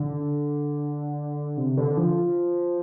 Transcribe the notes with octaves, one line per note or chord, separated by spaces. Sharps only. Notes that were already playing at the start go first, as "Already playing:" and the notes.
Already playing: D3
C3
D3
F3